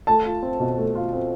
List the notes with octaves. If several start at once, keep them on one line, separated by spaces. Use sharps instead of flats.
A3 A5
F4
C4
B2
A3
F4
C4